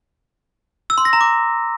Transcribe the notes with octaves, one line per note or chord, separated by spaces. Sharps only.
E6
C6
A#6
A#5
D6